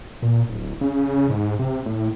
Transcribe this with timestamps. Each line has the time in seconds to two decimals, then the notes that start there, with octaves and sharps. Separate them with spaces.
0.22 A#2
0.49 D1
0.81 C#3
1.29 G#2
1.59 C3
1.86 A2